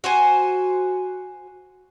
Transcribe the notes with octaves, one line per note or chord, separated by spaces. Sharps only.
F#4 C5 G#5